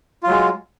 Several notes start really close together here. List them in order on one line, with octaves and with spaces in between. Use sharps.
F4 F#3 G#3